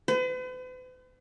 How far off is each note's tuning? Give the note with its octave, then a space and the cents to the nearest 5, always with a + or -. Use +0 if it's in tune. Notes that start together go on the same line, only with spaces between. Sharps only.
B4 +45